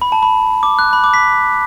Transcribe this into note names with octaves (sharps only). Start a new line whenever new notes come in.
B5
A5
B5
D6
F#6
B5
D6
B6